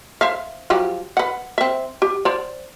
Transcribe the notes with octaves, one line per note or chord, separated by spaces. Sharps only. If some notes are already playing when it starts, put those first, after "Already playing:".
C5 E5 F5
F3 F#3 G4
B4 F#5
C4 E5
G4
C5 D5